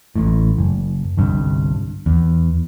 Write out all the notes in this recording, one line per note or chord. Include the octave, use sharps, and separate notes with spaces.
A1 A2
F#1
G1 C2 G2
E2